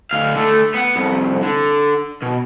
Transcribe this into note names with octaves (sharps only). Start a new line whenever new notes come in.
D2 F5
D3 A3
B3 F#5
C2 F2
D3
B2